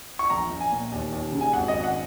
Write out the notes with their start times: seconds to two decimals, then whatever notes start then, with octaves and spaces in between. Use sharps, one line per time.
0.19 C#6
0.30 A#1 A#5
0.50 A#1
0.61 G#5
0.72 A#2
0.92 D#2
1.12 D#2
1.32 C#3
1.41 G#5
1.53 G#1 F#5
1.68 D#5
1.74 G#1
1.84 F#5